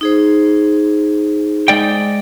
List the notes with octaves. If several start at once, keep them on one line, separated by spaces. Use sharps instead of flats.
D#4 G#4 C5
G#3 D5 G5